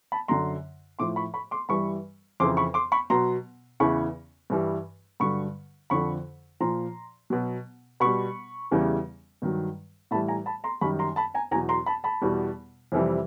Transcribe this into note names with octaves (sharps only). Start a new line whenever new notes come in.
A5 B5
F#2 D3 F#3 A#5 C6
A2 F3 C6 D6
B5 C#6
B5 C#6
C6 D6
G2 E3 G3 B5 C#6
F2 C#3 E3 C6 D6
B5 C#6
C6 D6
B5 C#6
B2 F#3 A#5 C6
E2 C#3 E3 B5 C#6
G2 E3 G3
G2 D3 F#3 B5 C#6
F2 D3 F3 B5 C#6
A#2 F3 A#5 C6
B2 F#3
B2 G3 B5 C#6
E2 C#3 E3 G3
G2 D#3 F#3
A2 E3 G3 A5 B5
G#5 A#5
A5 B5
A#5 C6
F#2 D#3 G3 B5 C#6
A#5 C6
A5 B5
G#5 A#5
E2 B2 F#3 G#5 A#5
A#5 C6
A5 B5
A5 B5
E2 B2 G3
F2 C3 E3 G3